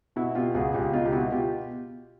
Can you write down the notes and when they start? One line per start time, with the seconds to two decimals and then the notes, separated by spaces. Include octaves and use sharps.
0.16 B2 E4 F#4
0.35 B2 F4 G4
0.54 C#2 F#4 G#4
0.74 C#2 F4 G4
0.93 B2 D#4 F4
1.06 G4
1.13 B2 E4 F#4
1.32 B2 F4 G4